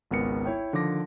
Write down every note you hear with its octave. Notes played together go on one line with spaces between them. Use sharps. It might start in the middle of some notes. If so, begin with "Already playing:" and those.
G#1 C#2 B3 A#4 C#7
E4 C#5 G5
D3 D#3 F3 D6 A#6